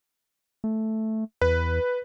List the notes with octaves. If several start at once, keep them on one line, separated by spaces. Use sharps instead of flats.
A3
E2 B4